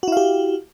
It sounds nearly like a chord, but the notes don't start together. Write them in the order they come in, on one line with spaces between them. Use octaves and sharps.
F#4 E4 F5 G4